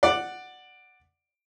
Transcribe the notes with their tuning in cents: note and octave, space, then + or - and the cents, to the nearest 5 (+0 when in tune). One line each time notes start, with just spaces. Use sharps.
D5 +10 F#5 +0